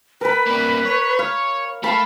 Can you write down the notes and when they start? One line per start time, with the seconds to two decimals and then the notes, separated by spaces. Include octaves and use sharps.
0.21 A#4 B4 B5
0.47 G3 A#3
0.86 C#5
1.19 F5
1.84 A3 F5 A5 B5